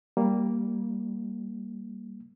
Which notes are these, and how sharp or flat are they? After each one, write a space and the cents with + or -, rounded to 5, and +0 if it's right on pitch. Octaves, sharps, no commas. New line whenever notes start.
G3 +0 A#3 +0